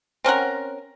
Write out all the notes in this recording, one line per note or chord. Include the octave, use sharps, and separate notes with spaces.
C4 C#4 A#4 F#5